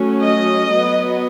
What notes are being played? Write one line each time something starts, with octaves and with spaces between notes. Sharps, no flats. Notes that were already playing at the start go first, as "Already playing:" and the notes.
Already playing: F#3 A3 C#4
D#5
F#3 B3